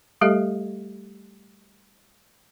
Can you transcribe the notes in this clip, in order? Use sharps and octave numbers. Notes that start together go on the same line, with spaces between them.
G3 A3 G4 A4 D#5 E5